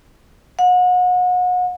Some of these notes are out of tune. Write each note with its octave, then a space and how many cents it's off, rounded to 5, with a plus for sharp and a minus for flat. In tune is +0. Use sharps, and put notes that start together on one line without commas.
F#5 -35